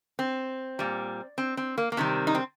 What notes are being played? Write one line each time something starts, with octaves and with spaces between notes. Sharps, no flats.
C4
A#2 G3
C4
C4
A#3
A#3
C3 D#3 G3 C4
D#4
C4